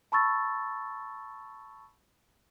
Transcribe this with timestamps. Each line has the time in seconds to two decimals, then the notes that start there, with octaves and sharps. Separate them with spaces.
0.12 A5 B5 C#6 E6 A6